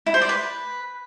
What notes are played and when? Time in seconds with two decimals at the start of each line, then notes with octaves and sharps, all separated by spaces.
0.06 E4
0.14 C5
0.21 D5
0.29 B4